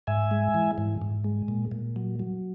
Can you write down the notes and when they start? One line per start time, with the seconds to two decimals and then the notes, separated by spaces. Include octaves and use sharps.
0.07 G#2 E5 G#5
0.31 G#3
0.54 E3
0.78 G#2
1.02 G#2
1.24 G#3
1.48 A#2
1.71 A#2
1.96 F#3
2.19 F#3